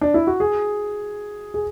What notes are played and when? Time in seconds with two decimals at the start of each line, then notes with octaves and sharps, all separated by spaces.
0.01 D4
0.14 E4
0.27 F#4
0.40 G#4
1.54 G#4